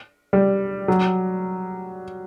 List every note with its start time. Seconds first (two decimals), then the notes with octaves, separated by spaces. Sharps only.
0.33 G3
0.88 F#3